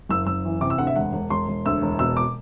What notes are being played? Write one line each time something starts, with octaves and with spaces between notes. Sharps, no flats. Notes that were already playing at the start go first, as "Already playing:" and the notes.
F#1 E6
F#1 E6
E3
C3 D6
E6
D2 F#5
E5
E1 F#5
E1
E1 C6
E1
D2 E6
E1
B2 E6
D6